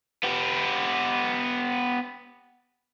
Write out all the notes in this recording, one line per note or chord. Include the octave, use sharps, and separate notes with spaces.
B3 G4